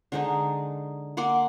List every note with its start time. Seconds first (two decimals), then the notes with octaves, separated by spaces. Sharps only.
0.12 D3 G#3 D#4
1.17 A#3 F#5 C6 D6